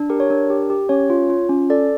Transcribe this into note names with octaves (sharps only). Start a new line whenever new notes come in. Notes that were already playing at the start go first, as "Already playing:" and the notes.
Already playing: D4
G4 A#4
C#5
D4 A#4
G4
G4
C#4 C#5
F4
F4
C#4
A4 D5